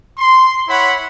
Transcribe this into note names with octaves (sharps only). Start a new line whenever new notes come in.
C6
E4 C#5 F#5 B5